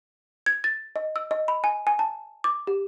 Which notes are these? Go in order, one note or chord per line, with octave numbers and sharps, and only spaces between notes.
G#6
A6
D#5
E6
D#5
B5
G#5
G#5
A5
D6
G4